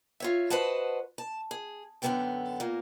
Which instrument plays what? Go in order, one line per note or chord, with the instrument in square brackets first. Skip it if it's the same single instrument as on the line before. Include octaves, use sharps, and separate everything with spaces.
[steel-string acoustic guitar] F4 C#5 E5
F#4 B4 C5 D#5 F#5 A5
A5
G#4
F#2 D3 F#3 B3 A4 G5
A#2 A#3